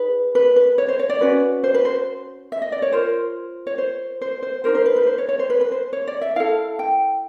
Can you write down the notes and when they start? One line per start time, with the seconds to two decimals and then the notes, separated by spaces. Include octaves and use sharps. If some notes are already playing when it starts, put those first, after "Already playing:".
Already playing: D#4 G#4 B4
0.35 B4
0.56 B4
0.78 C#5
0.88 C5
0.99 C#5
1.10 D5
1.21 C#4 F#4 B4
1.64 C5
1.74 B4
1.85 C5
2.52 E5
2.62 D#5
2.72 D5
2.82 C#5
2.92 F4 A#4 C5
3.67 C#5
3.78 C5
4.21 C5
4.42 C5
4.64 D#4 F#4 A#4 C5
4.75 C5
4.86 B4
4.96 B4
5.07 C5
5.18 C#5
5.29 C#5
5.39 C5
5.50 B4
5.61 B4
5.72 C5
5.93 C#5
6.07 D5
6.21 E5
6.36 E4 A4 F5
6.79 G5